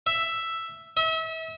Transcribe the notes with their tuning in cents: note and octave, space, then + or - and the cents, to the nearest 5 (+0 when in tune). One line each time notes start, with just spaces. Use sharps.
E5 +5
E5 -35